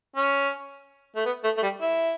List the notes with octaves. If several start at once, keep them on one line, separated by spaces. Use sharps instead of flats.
C#4
A3
B3
A3
A3
G3
E4